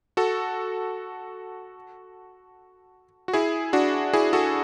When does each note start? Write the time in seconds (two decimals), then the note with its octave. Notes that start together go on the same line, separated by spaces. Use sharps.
0.17 F#4 A4
3.28 F#4
3.33 E4 G#4
3.73 D4 F#4
4.13 E4 G#4
4.33 F#4 A4